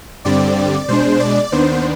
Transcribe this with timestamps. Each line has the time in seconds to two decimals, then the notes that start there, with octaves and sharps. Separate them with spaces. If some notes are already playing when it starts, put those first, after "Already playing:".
0.25 G2 D3 G3 C4 D5
0.88 B2 G#3 D4 C5
1.20 D5
1.52 D#2 D#3 B3 D4 C5